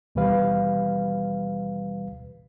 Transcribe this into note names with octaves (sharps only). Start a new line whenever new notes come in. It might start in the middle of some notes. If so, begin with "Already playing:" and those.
D#2 B2 E3 G3 B4 F5